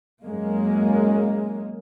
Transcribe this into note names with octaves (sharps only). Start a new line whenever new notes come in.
F#2 G#3 A#3